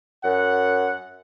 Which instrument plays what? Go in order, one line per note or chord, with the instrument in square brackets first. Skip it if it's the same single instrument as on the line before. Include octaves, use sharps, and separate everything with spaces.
[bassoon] F#2 [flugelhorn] F#5